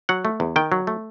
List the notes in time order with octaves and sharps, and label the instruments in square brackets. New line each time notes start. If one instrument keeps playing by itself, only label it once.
[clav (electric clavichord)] F#3 F#5
A3
E2
D#3 G5
F#3
A3